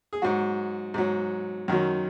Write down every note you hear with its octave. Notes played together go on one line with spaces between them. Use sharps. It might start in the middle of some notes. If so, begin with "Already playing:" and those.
G#4
G#2 F#3 F#4
G#2 F#3
F#2 D#3 F#3